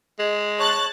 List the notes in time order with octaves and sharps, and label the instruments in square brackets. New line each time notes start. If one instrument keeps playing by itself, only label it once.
[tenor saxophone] G#3
[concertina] C#5 [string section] A5 F#6 A6